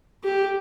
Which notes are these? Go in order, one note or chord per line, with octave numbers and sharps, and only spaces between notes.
G4